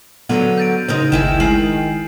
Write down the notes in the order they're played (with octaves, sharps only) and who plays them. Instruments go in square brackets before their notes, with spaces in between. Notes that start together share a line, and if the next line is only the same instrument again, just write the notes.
[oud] D3 F#3 F4 [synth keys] B3 D#7
[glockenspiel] G6 A6 D7
[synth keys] C#3 [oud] D#4 A#4 C5
[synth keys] G1 C#2 [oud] D#3 E4 G#4 [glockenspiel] E7
[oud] D#3 [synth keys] G#3 [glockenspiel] G#5 C7 F#7